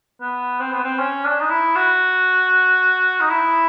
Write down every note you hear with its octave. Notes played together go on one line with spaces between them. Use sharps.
B3
C4
B3
C4
C#4
D4
D#4
E4
F#4
D#4
E4